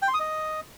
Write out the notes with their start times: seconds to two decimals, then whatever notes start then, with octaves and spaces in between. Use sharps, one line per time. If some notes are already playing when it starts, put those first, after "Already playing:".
0.02 G5
0.08 C6
0.14 D#6
0.20 D#5